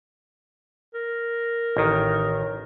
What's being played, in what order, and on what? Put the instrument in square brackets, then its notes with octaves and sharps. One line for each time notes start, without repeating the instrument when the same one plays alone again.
[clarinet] A#4
[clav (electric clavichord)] A1 D#3